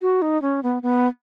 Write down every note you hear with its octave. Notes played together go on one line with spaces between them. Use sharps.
F#4
D#4
C#4
B3
B3